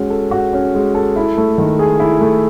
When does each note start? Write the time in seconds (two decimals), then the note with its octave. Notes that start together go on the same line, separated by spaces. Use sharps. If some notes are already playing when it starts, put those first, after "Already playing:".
Already playing: G#3 C#4 F#4
0.10 A4
0.31 F#4
0.53 C#4
0.75 G#3
0.95 A4
1.16 E4
1.38 A3
1.58 D#3
1.79 G#4
2.00 E4
2.21 A3